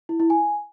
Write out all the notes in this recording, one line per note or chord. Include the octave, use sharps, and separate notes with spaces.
E4
E4
G#5